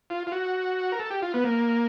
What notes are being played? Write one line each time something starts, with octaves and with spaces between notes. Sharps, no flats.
F4
F4
F#4
A#4
A4
G4
F4
B3
A#3